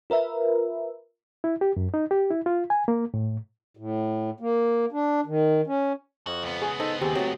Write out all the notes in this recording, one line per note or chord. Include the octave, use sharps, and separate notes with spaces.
F4 A#4 B4 E5
E4
G4
F#2
D#4
G4
E4
F4
G#5
A#3
A2
A2
A#3
D4
D#3
C#4
F2 F#4
C#2 B3
G#4
D#4 A4 C5
D#2 C4 G4 G#4
F#3 A3 C4